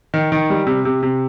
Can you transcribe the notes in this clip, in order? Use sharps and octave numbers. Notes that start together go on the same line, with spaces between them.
D#3
D#3
G3
C3
C3
C3